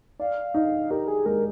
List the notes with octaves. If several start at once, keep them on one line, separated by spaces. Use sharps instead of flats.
D5 F5
D#4
G4 A#4
G#4
G#3 A#4